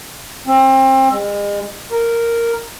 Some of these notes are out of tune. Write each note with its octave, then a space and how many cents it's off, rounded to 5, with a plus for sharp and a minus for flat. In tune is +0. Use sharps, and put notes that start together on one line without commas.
C4 +30
G#3 -35
A#4 -5